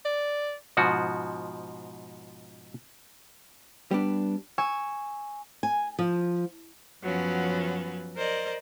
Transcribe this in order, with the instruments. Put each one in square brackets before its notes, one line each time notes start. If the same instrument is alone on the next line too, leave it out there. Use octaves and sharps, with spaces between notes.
[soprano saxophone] D5
[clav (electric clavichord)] G#2 B2 F3 F#4
[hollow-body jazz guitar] G3 B3 D4
[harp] G#5 C#6 E6
[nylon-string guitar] G#5
F3
[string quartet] F#2 F3 F#3 B3 C#4
A#4 C5 D5 D#5